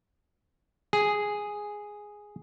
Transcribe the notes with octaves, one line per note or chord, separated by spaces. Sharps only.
G#4